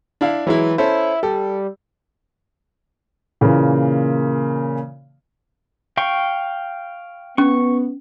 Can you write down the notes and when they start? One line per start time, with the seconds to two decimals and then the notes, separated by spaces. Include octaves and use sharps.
0.21 D4 E4 F5
0.47 E3 F#3 G#3 E4
0.78 C#4 E4 A4 C5
1.23 G3 A4
3.41 A#2 C#3 E3 A#3
5.97 F5 G5 C#6
7.38 B3 C#4 C#6